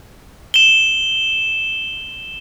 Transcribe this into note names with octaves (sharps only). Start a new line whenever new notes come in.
E7 G7